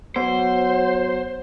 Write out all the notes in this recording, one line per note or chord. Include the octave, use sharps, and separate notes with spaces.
F#3 B3 C5